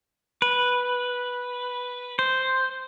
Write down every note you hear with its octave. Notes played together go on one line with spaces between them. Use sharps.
B4
C5